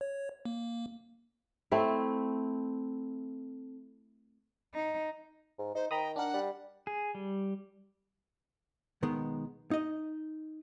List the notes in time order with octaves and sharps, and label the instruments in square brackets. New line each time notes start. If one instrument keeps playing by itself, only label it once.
[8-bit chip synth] C#5
A#3
[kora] A3 C4 E4
[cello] D#4
[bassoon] G#2
[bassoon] D#4 [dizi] C5
[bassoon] D#3 [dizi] G5 [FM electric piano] A#5 B5 D#6
[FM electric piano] D4 A#4 [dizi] F#5
[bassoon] G3
[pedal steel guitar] G#4
G3
[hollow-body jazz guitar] B1 D#3 G#3 B3
D#4 D#5